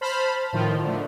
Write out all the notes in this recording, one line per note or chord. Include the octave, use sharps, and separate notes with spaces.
C5 A5 B5 F6
A2 D#3 F3 F4
D3 A3